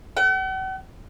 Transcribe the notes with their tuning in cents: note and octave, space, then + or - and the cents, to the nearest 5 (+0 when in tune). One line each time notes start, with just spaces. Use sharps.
F#5 +45